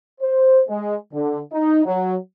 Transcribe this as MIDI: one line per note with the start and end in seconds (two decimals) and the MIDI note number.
0.21 0.61 72
0.68 0.95 56
1.13 1.39 50
1.53 1.82 63
1.86 2.16 54